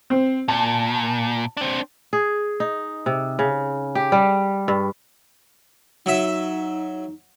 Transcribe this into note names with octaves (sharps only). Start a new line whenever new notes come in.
C4
A#2 A5
C4 D4
G#4
D#4
C3
C#3
G4
G3
G2
F#3 D#4 E5